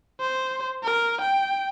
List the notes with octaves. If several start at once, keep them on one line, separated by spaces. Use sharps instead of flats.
C5
A#4
G5